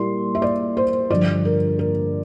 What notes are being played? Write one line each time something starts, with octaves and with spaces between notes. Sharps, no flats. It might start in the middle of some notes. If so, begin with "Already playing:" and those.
Already playing: A#2 G3 A#3 E4 C6
E5
D5
C5
G2 D3 F3 D5
A#4
A#4